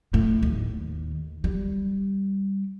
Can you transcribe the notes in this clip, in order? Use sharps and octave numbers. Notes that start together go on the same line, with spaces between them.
A2
D#2
G3